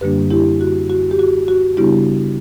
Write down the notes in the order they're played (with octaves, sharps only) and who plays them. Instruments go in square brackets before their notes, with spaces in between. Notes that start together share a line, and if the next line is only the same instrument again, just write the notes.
[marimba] F#2 D3 G3 A#3 D4 G4 B4
E4 G4
F#4
F#4
G4
F#4
F#4
C#3 G3 B3 D4 E4 G4